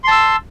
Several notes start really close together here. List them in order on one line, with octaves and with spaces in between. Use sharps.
C6 A5 E6